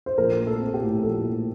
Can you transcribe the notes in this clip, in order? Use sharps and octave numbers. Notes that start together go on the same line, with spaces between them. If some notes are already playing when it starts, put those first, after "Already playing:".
C5
A#1 A#4
A3
A4
C4
G4
A2
A#1 A4
A3